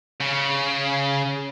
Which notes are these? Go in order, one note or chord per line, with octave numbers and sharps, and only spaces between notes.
C#3